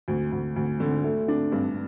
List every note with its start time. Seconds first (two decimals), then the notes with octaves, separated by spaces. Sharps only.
0.08 D2
0.32 D2
0.56 D2
0.80 D3
1.04 A3
1.28 D4
1.52 G2